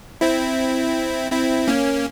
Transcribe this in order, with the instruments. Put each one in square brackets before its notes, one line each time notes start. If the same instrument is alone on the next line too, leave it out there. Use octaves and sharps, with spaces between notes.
[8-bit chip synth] C4 E4
C4 E4
A#3 C#4